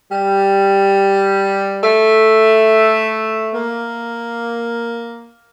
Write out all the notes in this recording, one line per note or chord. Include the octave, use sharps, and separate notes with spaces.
G3
A3
A#3